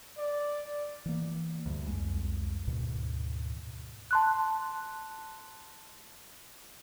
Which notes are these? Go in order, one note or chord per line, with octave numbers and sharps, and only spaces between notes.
D5
E3 A#3
D2 G2
C2 F2 G#3
D2 G#2 B2 D#3
A5 C6 F#6